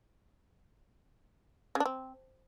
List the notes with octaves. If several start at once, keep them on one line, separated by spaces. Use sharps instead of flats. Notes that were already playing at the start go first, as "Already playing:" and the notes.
C#3
D4
C4